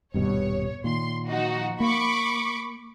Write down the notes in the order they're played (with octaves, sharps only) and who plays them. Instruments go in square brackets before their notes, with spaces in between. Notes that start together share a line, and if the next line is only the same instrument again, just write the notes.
[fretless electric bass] D#1 G2 B2 [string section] C#5
[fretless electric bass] A#2 D#3 [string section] C6
[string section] F3 D#4 F#4
[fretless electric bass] A#3 [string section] B5 C#6 D6